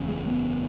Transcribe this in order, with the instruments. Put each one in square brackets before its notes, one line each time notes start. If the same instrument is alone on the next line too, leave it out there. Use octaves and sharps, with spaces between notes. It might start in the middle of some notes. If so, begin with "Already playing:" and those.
Already playing: [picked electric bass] F#1 E2 C#3
G#3
B3